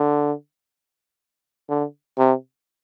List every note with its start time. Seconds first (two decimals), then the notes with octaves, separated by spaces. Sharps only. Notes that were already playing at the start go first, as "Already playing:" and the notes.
Already playing: D3
1.69 D3
2.18 C3